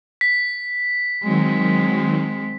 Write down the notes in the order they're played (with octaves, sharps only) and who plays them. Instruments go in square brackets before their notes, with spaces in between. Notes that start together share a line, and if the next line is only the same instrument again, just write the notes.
[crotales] B6
[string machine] D#3 F#3 [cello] G#3 C4